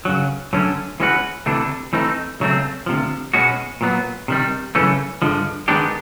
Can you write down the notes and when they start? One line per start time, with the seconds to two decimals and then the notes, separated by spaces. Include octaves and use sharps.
0.05 F#2 C#3 F#3
0.53 F#2 D3 F#3 A3 C#4
1.00 E3 G#3 C#4 F#4 B4
1.46 D2 C3 E3 A3 D4
1.93 E3 A3 C4 D#4
2.40 C#2 C#3 F#3 A3 C4
2.86 D2 C3 F3
3.33 B2 G#3 C#4 F#4
3.81 A#2 F#3 B3
4.28 C3 D#3 G3
4.75 F#2 C#3 E3 A3 C#4
5.22 G2 D3 F3 G#3
5.68 D#3 G#3 B3 D4 G4